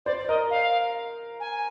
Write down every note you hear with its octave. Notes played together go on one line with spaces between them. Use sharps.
C5 D5
A#4 D#5
F5
G#5